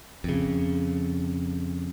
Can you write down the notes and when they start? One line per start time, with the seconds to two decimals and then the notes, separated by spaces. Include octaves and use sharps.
0.24 F2 C#3